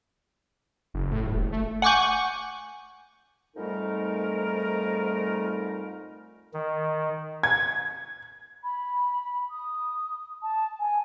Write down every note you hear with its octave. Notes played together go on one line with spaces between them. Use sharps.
F#1
A2
D#1
F#1
A3
F#5 G#5 C#6 D6 G6
F2 G#2 G3 A3 D#4 A#4
D#3
G#6
B5
D#6
A5
G#5